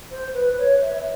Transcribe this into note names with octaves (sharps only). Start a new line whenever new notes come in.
C5
B4
C#5
E5